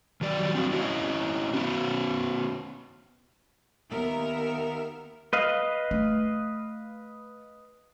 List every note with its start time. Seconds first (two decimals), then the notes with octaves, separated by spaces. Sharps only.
0.21 D#3 F#3 G3 D5
0.55 C4 D4 E4 F#4
0.72 C#4 E4 C#5 D#5
1.53 B3 C#4 F#4
3.89 D#2 B3 A#4 E5
5.33 B4 D#5 F5
5.91 A3